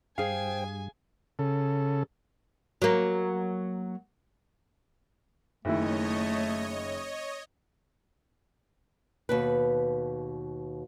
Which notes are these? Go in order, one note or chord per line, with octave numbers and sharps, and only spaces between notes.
G2 G#4 C5 F5 G5 G#5
C#3 A4
F#3 A#3
F#1 D#3 A3 E4 C#5 D#5
D#2 B2 B4